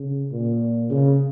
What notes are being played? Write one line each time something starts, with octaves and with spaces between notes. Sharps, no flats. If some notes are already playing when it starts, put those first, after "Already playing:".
Already playing: C#3
A#2
C#3